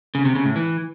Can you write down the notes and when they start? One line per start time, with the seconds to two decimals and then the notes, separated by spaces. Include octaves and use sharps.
0.15 C#3
0.25 C3
0.35 C#3
0.45 A2
0.56 E3